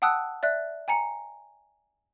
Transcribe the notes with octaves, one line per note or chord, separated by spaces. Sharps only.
F#5 G5 A5 D#6 E6 F#6
D5 E5 F#6
G5 G#5 A#5 C#7